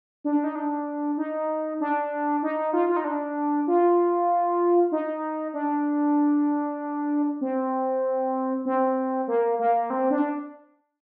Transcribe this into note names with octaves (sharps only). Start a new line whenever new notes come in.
D4
D#4
D4
D#4
D4
D#4
F4
F4
D#4
D4
F4
D#4
D4
C4
C4
A#3
A#3
C4
D4